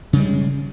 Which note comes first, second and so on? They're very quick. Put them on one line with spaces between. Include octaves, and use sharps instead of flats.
C#3 G3 G#3